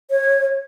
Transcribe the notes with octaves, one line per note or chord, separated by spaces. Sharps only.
C#5